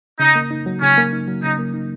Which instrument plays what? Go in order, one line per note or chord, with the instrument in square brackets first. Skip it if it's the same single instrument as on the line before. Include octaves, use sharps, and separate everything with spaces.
[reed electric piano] C#3 [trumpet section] D#4
[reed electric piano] A#3
D#4
F#3
[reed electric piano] C#3 [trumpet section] C#4
[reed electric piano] A#3
D#4
F#3
[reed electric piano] C#3 [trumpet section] D#4
[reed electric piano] A#3
D#4